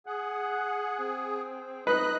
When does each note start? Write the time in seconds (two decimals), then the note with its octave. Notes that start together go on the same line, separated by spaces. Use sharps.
0.06 G#4 F#5
1.00 C4
1.87 D#4 B4 D#5 F#6